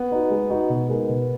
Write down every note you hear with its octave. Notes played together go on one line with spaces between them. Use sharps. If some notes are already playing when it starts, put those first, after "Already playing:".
Already playing: B3
D#4 F#4
G#3
D#4 F#4
B2
G#3 D#4 A#4
B2